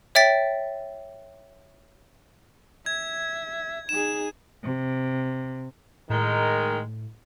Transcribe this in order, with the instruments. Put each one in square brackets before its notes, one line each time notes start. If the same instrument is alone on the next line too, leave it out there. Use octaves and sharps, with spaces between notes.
[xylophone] C#5 E5 G5 A6 B6
[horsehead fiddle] E5 [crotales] G#6
[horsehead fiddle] D#4 G#4 [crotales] E7
[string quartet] C3
[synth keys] A2 [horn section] D#3 G#3 A#4